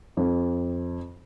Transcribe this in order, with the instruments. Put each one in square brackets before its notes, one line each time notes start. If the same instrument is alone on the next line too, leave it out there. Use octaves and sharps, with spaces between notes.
[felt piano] F2